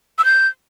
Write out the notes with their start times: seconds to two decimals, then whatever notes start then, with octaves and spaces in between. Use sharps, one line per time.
0.19 E6
0.25 G6